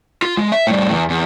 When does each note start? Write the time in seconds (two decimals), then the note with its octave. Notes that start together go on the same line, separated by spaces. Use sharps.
0.22 F4
0.37 G#3
0.52 E5
0.67 A2 G3
0.91 E2
1.10 E2